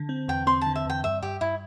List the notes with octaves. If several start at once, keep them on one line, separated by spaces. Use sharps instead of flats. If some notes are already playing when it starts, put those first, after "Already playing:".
Already playing: D3
C4
E2 G5
C4 C6
A5
D3
E5
E2 G5
G2 E5
G2 G4
G2 E4